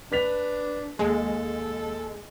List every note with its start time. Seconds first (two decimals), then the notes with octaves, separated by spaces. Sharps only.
0.12 D4 B4 B6 F7
0.99 D#2 G#3 A4